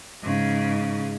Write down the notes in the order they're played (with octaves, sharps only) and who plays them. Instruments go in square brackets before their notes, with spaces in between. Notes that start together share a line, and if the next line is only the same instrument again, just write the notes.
[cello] G#2 C#3